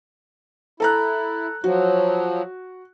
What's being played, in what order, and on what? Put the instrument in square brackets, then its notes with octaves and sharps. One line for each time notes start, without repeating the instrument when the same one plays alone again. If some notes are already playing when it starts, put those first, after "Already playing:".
[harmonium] E4 [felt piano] A4 A#5 F#6
[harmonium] F3 F#3 [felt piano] F#4